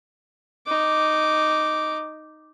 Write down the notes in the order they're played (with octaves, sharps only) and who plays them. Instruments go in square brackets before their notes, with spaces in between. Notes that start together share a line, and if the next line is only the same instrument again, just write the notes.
[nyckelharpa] D#4 D6